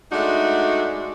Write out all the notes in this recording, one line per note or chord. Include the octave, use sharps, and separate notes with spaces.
G#3 A3 D4 D#4 F#4